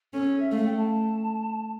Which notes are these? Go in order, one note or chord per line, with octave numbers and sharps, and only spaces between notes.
C#4 A4
A4
E5
A3 F5
G5
A5